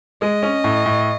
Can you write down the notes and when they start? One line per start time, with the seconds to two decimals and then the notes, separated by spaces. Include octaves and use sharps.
0.22 G#3 D#5
0.43 C#4
0.64 A2
0.86 A2